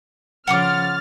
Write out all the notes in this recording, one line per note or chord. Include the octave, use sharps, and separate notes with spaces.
C#3 F3 F#5 C6 D6 F6 A6